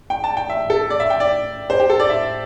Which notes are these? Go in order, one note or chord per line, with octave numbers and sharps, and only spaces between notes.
G5
A5
G5
E5
A4
D5
E5
G5
D5
C5
G4
A4
D5
E5